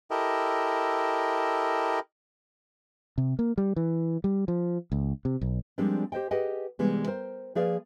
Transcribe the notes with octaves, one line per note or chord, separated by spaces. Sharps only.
E4 G4 A4 A#4 D#5
C3
A#3
G3
E3
G3
F3
C#2
C3
B1
F3 G3 G#3 A#3 C4 D4
G4 C5 D#5 G5
G4 G#4 B4 D#5 F#5 G5
C3 E3 G3 G#3 B3
A#4 C5 G5
F3 A#3 G#4 B4 D5 F5